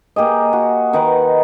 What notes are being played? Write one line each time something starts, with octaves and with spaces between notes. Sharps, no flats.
A#3 G4 G#4 D#5
F#4
D#3 D#4 B4 F#5